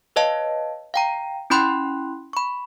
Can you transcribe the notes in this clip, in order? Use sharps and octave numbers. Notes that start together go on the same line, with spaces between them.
B4 C#5 D#5 F5 A5
F5 G5 A#5
C#4 E4 G5 B5 C6 F#6
B5 C#6